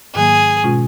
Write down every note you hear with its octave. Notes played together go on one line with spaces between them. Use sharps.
G#2 D#3 F#3 A#3 G#4
B2 G#3 C#4 F4